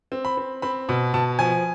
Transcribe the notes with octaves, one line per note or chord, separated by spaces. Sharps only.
C4
B5
C4
C4 B5
B2 B5
B2 A5
F3 G#5